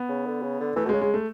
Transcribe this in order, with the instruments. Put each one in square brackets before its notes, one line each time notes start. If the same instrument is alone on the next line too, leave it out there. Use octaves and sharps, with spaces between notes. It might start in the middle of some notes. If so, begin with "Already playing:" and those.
Already playing: [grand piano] B3
[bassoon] C#3
D3
C#3
D3
[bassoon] E3 [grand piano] A3
[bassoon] B2
[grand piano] G#3
[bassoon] C#3
[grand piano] G#3
A3